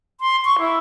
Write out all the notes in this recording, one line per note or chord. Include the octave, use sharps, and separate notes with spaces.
C6
C#6
E4